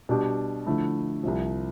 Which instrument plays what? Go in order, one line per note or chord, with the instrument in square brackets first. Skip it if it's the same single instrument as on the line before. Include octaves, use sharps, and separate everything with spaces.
[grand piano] B2 G3 D4 G4
D3 F3 A3 E4
C2 C3 F3